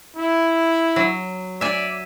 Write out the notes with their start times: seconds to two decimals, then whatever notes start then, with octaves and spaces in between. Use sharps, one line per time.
0.17 E4
0.96 F#3
1.61 D5 E5 G#5